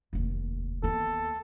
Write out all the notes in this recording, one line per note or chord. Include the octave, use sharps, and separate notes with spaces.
F1 D#2
D#2 B3 A4